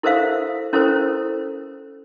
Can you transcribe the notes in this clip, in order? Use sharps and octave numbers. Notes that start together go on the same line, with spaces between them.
E4 A4 A#4 C5 E5 F5
C#4 E4 A4 A#4 C5